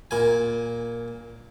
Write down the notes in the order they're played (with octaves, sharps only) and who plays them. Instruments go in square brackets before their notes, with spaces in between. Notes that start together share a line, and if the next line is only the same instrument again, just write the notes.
[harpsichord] A#2 G#5